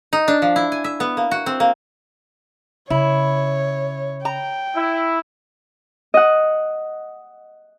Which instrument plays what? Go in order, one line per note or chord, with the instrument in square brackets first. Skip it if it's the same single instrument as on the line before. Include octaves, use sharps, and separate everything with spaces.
[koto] D#4
D4
F3
E4
G#5
E5
B3
A#3
F#4
C4
A#3
[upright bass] C#3 [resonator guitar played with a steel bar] E4 [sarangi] C#5
[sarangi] G5 [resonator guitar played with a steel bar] A#5
[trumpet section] E4
[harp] D#5 F#5